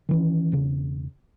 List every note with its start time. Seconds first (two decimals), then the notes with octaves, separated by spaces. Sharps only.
0.09 D#3 E3 C#4
0.52 E1 C#3